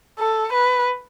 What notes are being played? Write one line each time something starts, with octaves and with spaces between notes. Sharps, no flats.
A4
B4